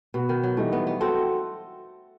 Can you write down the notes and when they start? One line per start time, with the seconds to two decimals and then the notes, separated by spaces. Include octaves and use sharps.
0.14 B2 B3 F#4 B4
0.29 D#3
0.43 F#3
0.57 E3 G3 A3 D#4
0.72 B3
0.87 B3
1.00 C4 F#4 A4